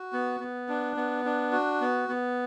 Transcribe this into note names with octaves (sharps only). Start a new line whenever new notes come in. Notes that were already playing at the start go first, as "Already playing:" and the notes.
Already playing: F#4
B3
B3
D4
B3
D4
F#4
B3
B3